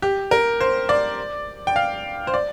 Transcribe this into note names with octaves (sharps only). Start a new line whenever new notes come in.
G4
A#4
C5
D5
G5
F5
C5
D5